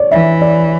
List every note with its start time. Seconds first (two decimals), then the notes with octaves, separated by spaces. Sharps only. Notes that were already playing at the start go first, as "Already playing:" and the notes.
Already playing: C#5 D5
0.11 E3 E5
0.42 D5